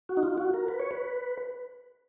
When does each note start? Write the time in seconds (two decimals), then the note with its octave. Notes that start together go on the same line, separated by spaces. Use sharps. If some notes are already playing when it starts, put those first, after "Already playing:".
0.09 F#4
0.17 D#4
0.23 F4
0.38 F#4
0.54 A#4
0.68 B4
0.80 C#5
0.91 B4